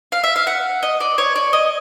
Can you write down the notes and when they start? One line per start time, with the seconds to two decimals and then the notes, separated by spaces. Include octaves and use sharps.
0.12 F5
0.23 E5
0.36 F5
0.47 F#5
0.83 D#5
1.00 D5
1.18 C#5
1.36 D5
1.53 D#5